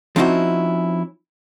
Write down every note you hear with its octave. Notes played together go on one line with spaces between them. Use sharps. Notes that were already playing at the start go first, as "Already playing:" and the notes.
F3 C4 C#4 D#4 E4 F#4